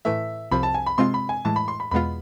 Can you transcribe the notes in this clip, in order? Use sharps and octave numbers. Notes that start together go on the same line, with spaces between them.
A2 E3 A3 E5
C2 C3 F3 B5
A5
G#5
B5
C3 G#3 C4 F4 C6
B5
G#5
A2 E3 G#3 A5
B5
C6
B5
E2 B2 G#3 B3 F4 B5